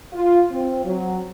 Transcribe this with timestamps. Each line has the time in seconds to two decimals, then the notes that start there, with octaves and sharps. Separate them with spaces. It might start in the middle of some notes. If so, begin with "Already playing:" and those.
0.13 F4
0.51 C4
0.85 F#3